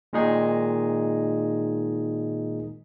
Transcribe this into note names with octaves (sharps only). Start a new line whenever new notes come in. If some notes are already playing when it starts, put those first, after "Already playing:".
A#2 D#3 G#3 D#4 G#4